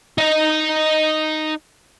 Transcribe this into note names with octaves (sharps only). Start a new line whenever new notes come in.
D#4 D#5